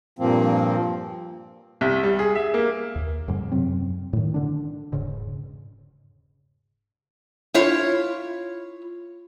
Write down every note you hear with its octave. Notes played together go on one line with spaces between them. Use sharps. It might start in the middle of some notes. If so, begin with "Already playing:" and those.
G2 A#2 F3 A#3 C4
C2
G3
G#4
E5
A#3
D#2
F2 G#2 C#3 G3
F#2 C3 F#3 C4
A2 D#3
D3 D4
E1 G#2 C#3
E4 F4 C#5